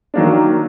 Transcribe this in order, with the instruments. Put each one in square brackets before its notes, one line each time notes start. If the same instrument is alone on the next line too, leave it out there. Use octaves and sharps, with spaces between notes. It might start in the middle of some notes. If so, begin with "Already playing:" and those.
[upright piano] D#3 F#3 A#3 D4